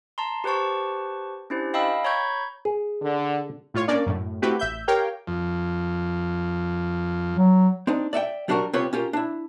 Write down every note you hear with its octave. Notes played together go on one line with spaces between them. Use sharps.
A5 A#5 C6
G4 B4 C5 A5 C#6
C#4 D4 E4 G4 C5
D#5 F5 G5 A5 B5 E6
C#5 A#5 B5 C#6 G6 G#6
G#4
D3
A2 F4 C#5
A#3 C#4 D4 A#4 D5
F#2 A2
A3 C4 E4 F#4 G4 B4
A1 E5 G6
G4 A#4 C#5 F5 G5
F2
F#3
C4 D4 D#4
D5 E5 F#5 G5
F#3 G3 D4 D#4 F#4 A#4
C2 C4 F4 G4 B4 C#5
C#4 F4 G4 A#4
D4 E4